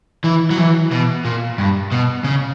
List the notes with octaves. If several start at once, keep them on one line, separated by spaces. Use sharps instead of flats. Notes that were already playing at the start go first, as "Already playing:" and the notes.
E3
F#3
E3
B2
A#2
G2
B2
C#3